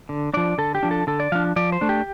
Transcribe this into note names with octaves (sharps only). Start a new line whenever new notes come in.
D3
F3 D4 D5
D3 A4
G4
F3 D4
A4
D3 A4
D5
F3 D4 F5
F3 D5
C5
A3 D4
G4